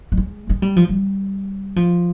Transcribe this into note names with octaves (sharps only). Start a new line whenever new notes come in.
G3
G#3
G#3
G3
F3
G3
F3